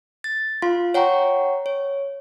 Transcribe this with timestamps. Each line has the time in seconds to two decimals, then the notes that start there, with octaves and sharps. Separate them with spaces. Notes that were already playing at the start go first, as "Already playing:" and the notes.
0.24 A6
0.62 F4 F5 C6
0.94 C#5 F#5 G5 A#5 C#6
1.66 C#5